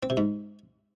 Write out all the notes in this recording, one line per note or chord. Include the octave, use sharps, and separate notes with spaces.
C4
C3
G#2